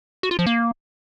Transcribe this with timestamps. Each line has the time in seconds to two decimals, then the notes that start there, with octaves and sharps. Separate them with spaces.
0.23 F#4
0.31 F4
0.39 F3
0.46 A#3